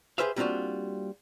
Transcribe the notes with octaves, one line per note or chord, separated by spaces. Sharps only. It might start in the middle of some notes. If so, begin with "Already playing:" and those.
G4 G#4 B4 C5 E5 F5
G3 A#3 C4 D4 F4 F#4